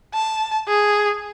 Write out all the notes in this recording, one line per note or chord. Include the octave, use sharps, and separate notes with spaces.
A5
G#4